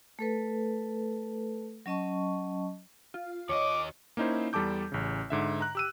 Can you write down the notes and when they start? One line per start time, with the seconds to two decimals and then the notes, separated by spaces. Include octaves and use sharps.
0.19 A3 A4 B4
1.86 F#3 C#4 D#5 A5 C#6
3.14 F4
3.49 D#2 C#5 D#5 D6
4.17 A#3 C#4 D#4 E4 C5
4.53 E2 G3 A4 A5 D6 G6
4.92 A1 C#3
5.30 G#2 D3 E5
5.61 A#5 F#6
5.75 G4 E6 D#7